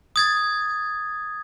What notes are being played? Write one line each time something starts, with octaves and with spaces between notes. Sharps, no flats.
D#6 G#6 A6